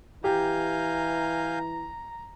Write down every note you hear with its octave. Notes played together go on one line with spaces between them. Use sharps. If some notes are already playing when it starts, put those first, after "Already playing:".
E3 G4 F5 G#5 A#5 G6